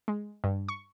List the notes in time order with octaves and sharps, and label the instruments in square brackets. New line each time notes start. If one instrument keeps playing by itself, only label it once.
[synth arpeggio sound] G#3
G2
C#6